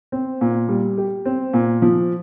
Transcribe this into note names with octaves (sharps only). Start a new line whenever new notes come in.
C4
A#2
G3
G4
C4
A#2
F3